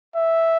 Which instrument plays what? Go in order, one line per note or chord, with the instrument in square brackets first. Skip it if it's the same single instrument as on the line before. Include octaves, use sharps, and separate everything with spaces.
[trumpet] E5